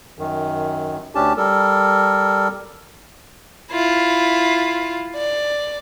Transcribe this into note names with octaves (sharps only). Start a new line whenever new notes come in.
F#2 D#3
D2 C#4 D4 G4 A5
G3 A4 A#4
E4 F4
D5